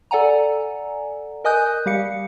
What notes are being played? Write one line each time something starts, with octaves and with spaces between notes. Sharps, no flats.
A4 D5 F#5 G#5 A#5
A#4 D#5 G#5 D#6 F#6 G6
G3 G4 F5 C#7